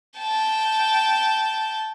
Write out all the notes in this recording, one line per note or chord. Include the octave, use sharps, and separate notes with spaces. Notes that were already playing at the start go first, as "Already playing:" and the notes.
G5 A5